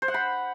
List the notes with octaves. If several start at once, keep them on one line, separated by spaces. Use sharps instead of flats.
C5
F#5
B5